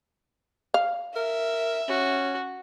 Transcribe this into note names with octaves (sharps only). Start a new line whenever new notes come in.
F5
A#4 E5
C#4 F#4